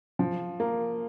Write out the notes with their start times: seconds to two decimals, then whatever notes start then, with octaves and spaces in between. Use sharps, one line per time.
0.19 F3
0.60 A#3